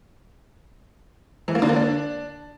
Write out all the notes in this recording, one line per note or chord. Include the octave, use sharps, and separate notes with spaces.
E3
A#3
D3
A#3
D4